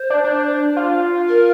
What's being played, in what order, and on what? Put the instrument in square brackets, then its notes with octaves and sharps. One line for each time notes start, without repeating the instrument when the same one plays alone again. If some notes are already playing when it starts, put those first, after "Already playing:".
Already playing: [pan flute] C5
[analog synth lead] D4
D4
F4
[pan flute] A#4